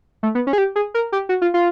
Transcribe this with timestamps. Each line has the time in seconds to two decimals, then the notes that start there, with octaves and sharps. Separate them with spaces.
0.23 A3
0.35 B3
0.47 C#4
0.53 G#4
0.58 G4
0.76 G#4
0.94 A#4
1.12 G4
1.29 F#4
1.42 F4
1.54 F4